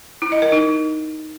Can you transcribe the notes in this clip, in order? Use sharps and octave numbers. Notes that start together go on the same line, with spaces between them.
E4
D#5
A#4
D#4